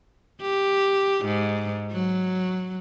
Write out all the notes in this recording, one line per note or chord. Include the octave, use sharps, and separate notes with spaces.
G4
G#2
F#3